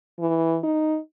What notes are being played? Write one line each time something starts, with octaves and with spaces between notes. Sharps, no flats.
E3
D#4